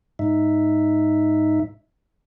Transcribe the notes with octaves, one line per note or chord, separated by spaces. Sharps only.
G#2 D#4 E5